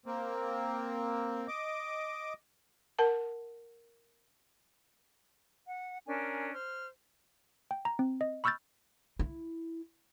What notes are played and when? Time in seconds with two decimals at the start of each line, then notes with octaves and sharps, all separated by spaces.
0.06 A#3 C4
1.48 D#5 D6
2.99 A#4 F#5 A5
5.67 F#5
6.06 C#4 D4 A#4 G#5
6.52 C5 F6
7.71 G5
7.85 A#5
7.99 C4
8.21 D#5
8.44 B5 C#6 E6 F6 G6 A6
9.19 E4